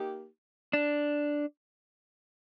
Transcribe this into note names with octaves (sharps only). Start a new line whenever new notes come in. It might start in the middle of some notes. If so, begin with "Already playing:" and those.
Already playing: A#3 D#4 G4
D4